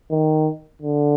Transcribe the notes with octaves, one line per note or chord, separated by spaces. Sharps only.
D#3
D3